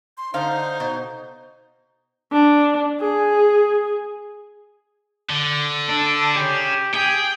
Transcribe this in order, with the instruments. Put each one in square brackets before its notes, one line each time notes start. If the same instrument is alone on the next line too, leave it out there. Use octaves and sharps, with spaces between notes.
[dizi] C6
[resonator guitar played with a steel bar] D3 F5 [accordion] D#4 [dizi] C5
[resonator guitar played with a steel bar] B2
[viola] D4
G#4
[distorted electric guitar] D3
[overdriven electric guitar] D4 [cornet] A4
[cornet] G4 [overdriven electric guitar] G#4 C#5
[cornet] G4 [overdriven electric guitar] G#4 G#5 [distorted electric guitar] G5